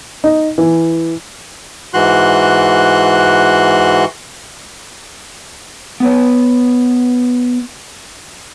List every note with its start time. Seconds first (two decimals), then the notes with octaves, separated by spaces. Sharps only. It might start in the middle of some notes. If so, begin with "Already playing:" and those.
0.24 D#4
0.58 E3
1.94 G#2 E3 F#4 C6 F#6
6.00 B3 B4 C#5